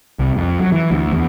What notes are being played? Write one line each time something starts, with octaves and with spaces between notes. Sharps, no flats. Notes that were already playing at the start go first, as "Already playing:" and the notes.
C2
F2
F#3
E3
D2
E2